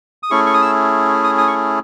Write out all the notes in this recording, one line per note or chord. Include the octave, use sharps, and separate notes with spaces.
D#6
A3 C#4 E4 G#4 C#6
C#6
D#6
E6
D#6
D#6
C#6